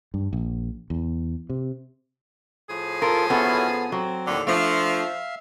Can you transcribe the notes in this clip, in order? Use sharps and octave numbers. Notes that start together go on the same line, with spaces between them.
G2
A#1
E2
C3
A2 F3 G#4
F4 A4 A#4
B3 C#4 E4 F#4 A4
F#3 C4
D#2 A2 D3
F3 A3 D4 E5 F5